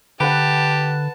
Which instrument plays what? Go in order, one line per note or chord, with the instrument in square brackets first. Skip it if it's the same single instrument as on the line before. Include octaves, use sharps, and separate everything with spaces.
[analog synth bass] D3 [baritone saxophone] G4 [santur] B4 F#5 [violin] A5